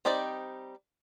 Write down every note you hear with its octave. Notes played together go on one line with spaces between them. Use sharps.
G3 C4 D#4 G4 D5